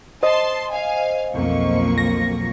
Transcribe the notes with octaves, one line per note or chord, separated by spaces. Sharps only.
C5 D#5 A5 C6
F5 G#5
B1 F2 F3 A#3 C#6
A#6